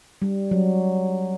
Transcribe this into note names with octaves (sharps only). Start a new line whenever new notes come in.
G3
F#3